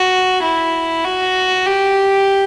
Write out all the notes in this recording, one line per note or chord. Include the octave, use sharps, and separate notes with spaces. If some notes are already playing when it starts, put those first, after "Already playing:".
Already playing: F#4
E4
F#4
G4